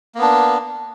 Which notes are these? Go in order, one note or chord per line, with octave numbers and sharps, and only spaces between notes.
A#3 B3 D4